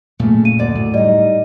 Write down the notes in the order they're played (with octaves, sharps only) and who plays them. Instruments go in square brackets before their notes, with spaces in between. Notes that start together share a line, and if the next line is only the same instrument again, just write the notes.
[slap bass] A#2 A#3 [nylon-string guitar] C#3 A3
[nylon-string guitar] F5 [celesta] D#7
[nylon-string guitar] D2 D5
[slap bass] A2
[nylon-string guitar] G3 D#4 [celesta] D5 D#5